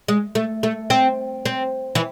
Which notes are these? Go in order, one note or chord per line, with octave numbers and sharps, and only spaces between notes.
G#3
A3
A3
C4
C4
E3